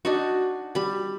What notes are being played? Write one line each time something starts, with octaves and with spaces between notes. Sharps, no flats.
D4 D#4 F#4
G3 B5